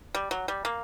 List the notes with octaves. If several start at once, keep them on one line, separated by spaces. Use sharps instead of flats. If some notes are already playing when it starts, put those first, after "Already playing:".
G3
F#3
G3
A#3